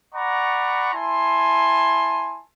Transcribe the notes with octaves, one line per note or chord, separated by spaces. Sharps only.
D5 F#5 A#5 B5 C#6
E4 G#5 A5 C6